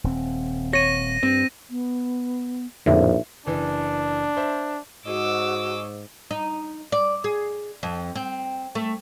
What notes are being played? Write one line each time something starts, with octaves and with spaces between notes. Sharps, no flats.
D#1 C4
C#5 A#6 D#7
G2 C4
B3
A#1 F2 A2 D3 F3 D#4 E5
F#1 E3 D4
C5 E5
G#2 F#4 G#4 C#5 D#5 D6 E6
D#4
D5
G#4
F2
C4
A3